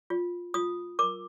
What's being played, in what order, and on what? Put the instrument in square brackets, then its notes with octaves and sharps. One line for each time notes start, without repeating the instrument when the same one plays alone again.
[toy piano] F4
F4 D#6
A#4 D6